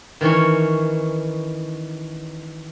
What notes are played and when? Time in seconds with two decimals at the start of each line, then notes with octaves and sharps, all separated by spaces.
0.21 D#3 E3 C#4 C#5